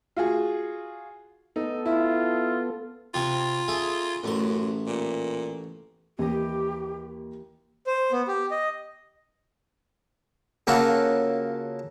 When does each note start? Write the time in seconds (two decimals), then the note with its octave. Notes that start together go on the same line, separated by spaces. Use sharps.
0.17 F4 F#4 G#4
1.56 B3 D#4 A4
1.86 E4 F4
3.14 C3 C4 F4 C#6
3.68 G#4 A4 E5
4.24 A1 F#2 A3 C6
4.87 A#2
6.19 D#2 E3 G4 D#5
7.87 C5
8.12 B3
8.28 G4
8.51 D#5
10.67 C#3 A#3 F4 F#4 A4